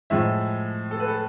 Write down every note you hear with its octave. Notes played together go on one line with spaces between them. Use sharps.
A2 F3 G#3 E5
A4
B4
A4